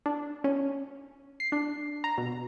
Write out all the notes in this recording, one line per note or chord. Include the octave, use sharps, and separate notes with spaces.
D4
C#4
C7
D4
A#5
B2